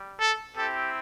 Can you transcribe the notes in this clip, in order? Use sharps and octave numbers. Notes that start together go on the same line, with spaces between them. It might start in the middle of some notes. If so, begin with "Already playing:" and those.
Already playing: G3
A4
C4 E4 G4 A4